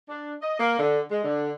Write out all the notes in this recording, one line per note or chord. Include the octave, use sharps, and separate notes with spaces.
D4
D#5
A#3
D3
G#3
D3